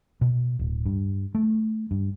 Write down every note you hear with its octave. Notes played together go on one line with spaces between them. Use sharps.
B2
D1
G2
A3
G2